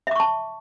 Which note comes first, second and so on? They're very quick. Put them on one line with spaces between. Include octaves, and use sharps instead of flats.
E5 D6 C#6 A5